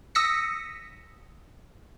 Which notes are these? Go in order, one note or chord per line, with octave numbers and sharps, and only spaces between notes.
D#6 E6 A#6 B6 C#7